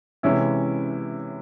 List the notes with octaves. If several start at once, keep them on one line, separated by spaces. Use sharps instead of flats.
C3 E3 G#3 C#4 E4